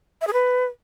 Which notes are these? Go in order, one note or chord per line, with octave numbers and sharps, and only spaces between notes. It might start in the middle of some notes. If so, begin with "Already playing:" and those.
E5
G#4
B4